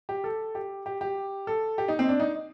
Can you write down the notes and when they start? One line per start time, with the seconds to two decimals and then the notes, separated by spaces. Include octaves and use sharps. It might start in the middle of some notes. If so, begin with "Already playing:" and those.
0.09 G4
0.24 A4
0.55 G4
0.86 G4
1.01 G4
1.47 A4
1.78 G4
1.88 D#4
1.99 C4
2.09 D4
2.20 D#4